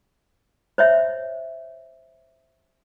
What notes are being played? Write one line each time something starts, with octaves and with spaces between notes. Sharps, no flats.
C5 C#5 E5